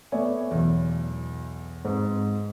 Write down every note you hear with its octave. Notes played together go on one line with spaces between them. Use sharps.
A3 B3 C#5 D5 E5 G#5
B1 E2
G#2 C4